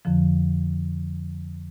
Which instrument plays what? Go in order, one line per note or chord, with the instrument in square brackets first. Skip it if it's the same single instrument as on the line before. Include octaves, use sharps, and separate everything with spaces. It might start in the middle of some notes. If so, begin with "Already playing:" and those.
[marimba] F2 D3 F3